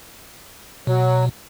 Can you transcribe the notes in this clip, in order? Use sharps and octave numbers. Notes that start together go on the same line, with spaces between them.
B2 F#3